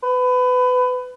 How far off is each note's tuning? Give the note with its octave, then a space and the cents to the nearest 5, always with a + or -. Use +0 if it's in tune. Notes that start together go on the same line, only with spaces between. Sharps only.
B4 +25